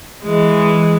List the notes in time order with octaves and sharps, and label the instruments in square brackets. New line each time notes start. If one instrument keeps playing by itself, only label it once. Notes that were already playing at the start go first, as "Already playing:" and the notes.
[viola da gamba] E3 G#3